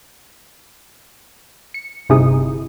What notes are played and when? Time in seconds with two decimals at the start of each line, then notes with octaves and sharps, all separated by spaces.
1.74 C#7
2.09 G1 C3 D#4 E4 G#4 D#6